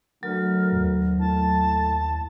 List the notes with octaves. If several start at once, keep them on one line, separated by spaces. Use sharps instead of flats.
D2 F#3 A#4
D#2
A2 A5